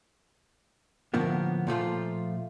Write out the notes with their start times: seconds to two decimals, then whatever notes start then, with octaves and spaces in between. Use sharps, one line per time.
1.14 A2 D3 F3 A#3 B3
1.67 A#2 F3 A3 F4